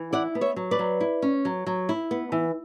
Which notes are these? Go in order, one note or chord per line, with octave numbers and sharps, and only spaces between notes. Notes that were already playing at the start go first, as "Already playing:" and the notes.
Already playing: E3
E4 D5 F#5
B3
C#5 E5
F#3
B4 D5
F#3
E4
C#4
F#3
F#3
E4
B3
E3